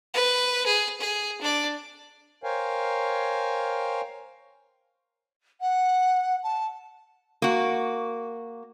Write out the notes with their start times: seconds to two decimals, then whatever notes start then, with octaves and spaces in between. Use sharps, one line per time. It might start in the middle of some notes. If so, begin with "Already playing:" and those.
0.14 B4
0.66 G#4
1.01 G#4
1.41 D4 D5
2.44 A#4 C5 C#5 F5 G5 G#5
5.61 F#5
6.43 A5
7.42 A#3 F#4